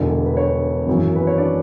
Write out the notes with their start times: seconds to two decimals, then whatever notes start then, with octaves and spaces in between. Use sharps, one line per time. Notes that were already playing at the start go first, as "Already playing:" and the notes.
Already playing: E1 E2 D3
0.26 B4
0.37 C#5
0.87 G#1 F#2 E3
1.15 B4
1.27 C#5
1.38 D4 D5